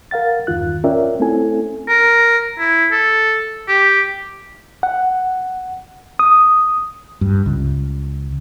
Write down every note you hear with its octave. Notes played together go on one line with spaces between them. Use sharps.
A#4 F5 F#5 A6
E2 G2 D#3 F4 F#6
C#4 F4 A#4 D5 E5 G5
A3 C4 C#4 E4 A4 G#5
A#4
E4
A4
G4
F#5
D#6
G2
C#2